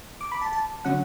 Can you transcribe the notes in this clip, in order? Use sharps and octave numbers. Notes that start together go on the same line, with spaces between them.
D6
B5
A5
A5
D3 F#3 C#4 F#5